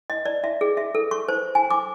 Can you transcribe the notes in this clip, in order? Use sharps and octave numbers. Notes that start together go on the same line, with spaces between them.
D#5
D5
E5
G#4
E5
A4
C#6
C5
G#5
D6